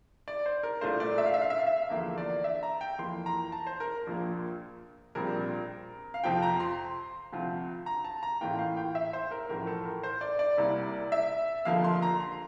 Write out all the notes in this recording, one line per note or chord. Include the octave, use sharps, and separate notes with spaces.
D5
C5
A#4
C2 A#2 A3 D4 F4 C5
D5
E5
F5
E5
F5
E5
F5
E5
E2 D3 F3 A#3
D5
E5
A#5
G5
F2 E3 A#3 C6
A#5
A5
C5
A#4
A#1 A#2 F3 A#3
A#1 A#2 G3 C4 A#4
F5
F2 C3 F3 C4 F4 G5
A#5
C6
D2 C3 F3 C4 F4
A#5
A5
A#5
A1 A2 E3 A#3 F4 G5
F5
G5
E5
C5
A#4
A1 A2 F3 A#4
A4
A#4
C5
D5
D5
C2 C3 G3 A#3 E4
E5
F1 F2 D3 F3 A#3 F5
C6
A#5
C6